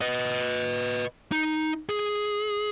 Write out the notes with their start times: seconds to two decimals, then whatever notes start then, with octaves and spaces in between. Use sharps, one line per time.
0.01 B4 D#5
1.32 D#4
1.89 G#4